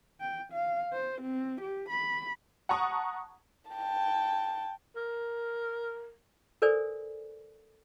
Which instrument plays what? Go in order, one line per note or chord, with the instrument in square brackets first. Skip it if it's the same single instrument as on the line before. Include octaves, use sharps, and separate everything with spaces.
[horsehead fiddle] G5
F5
C5
C4
G4
B5
[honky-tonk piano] F#5 A5 A#5 C#6 D#6
[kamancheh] G5 A5
[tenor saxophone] A#4
[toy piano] A4 A#4 C5 D5 G#5